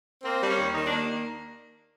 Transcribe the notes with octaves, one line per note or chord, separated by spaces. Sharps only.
A#3 C4
G3 D4
C#4
D#2
D#3 D#4
D4
A#3